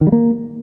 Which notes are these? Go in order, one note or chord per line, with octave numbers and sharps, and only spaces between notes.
D#3
G3
A#3